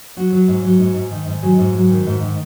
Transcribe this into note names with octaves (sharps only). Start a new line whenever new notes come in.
F#3 F#4
F#3
G#2
F#3
G#2
G#2
D#3
G#2
F#3 G#4
G#2
F#3
D#3
G#2
D#3